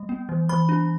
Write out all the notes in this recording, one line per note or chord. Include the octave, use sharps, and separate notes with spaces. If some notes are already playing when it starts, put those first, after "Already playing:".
Already playing: G3
B3
E3
E3 B5
D4